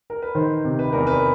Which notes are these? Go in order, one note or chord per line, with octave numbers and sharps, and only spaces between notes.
A#4
B4
D#3 C5
C3
B4
E2 A#4
B4